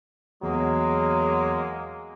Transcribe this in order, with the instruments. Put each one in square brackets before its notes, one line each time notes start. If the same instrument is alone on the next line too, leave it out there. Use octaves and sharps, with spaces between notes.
[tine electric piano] E2 [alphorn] F#3 [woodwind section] G#3 A#3